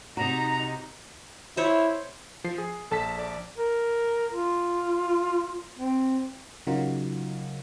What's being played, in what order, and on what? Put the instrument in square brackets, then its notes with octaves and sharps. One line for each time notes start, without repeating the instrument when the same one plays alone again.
[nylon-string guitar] C3 F#4 [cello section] D#4 [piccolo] A#5
[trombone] E4 [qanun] C5 C#5
[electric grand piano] F3 C7
G#4
[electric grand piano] A#1 A5 B6 [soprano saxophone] A4
[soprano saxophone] D5
[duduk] A#4
F4
C4
[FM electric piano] C#3 F#3 D#4 F4 F#4 A#4